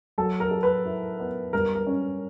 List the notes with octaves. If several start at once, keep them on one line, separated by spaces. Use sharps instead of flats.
F#3 A4
A#4
A4
B4
E4
B3
G2 A#4
A#4
C#4